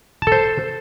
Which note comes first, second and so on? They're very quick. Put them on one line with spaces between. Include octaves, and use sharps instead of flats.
A5 A4 C5